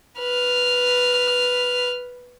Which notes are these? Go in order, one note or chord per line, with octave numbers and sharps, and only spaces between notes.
B4 F6